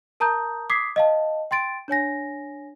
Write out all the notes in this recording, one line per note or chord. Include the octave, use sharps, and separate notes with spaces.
A#4 A5 A#5 D#6 G6
D6 D#6 G#6 B6 C7
D#5 F5 A5
G5 C6 A6 D7
D4 C#5 G#5 A#6